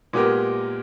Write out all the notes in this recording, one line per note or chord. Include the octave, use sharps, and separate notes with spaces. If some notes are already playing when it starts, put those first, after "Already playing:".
A#2 G#3 B3 G4 A#4